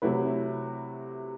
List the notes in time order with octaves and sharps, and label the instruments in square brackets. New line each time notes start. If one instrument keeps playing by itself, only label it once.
[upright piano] C3 F#3 A3 E4 B4